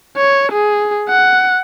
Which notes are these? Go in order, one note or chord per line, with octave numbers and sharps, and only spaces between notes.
C#5
G#4
F#5